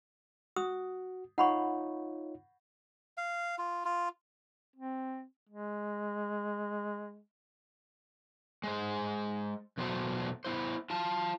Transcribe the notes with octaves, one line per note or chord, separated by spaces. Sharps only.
F#4 D#6
D#4 F4 C#5 F#5 B5 C#6
F5
F4
F4
C4
G#3
G#3 C5
E2 B2 F#3 A3 C5
B3 E4 C5
F4 A5